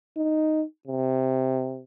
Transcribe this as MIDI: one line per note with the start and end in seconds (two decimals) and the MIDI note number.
0.17 0.64 63
0.88 1.83 48